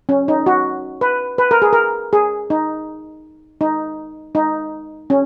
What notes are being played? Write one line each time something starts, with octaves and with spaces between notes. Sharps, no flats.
C#4
D#4
F#4
B4
B4
A#4
G#4
A#4
G#4
D#4
D#4
D#4
C#4